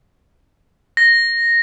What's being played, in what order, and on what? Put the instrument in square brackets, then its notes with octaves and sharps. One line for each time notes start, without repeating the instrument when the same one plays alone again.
[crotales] A#6